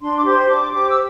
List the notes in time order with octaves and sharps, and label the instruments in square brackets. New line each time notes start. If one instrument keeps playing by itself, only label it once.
[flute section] D4 C6
D6
G4 C5 C6
D4 D6
G4 C5 D6
E6